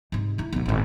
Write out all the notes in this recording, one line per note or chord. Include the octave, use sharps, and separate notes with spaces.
G#2 C3
A3 E4
B1 F#3
G#1 A2